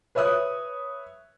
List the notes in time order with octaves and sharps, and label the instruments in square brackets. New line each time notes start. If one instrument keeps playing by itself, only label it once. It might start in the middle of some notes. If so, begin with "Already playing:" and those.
[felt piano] B4 C#5 E5 D#6 F#6